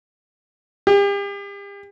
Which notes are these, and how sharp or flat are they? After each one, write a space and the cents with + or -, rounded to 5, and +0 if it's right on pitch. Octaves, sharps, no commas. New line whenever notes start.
G4 +40